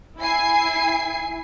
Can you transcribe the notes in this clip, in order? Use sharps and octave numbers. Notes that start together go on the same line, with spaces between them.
E4 G#5 C7